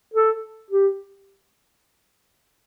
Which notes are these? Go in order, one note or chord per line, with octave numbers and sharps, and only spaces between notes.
A4
G4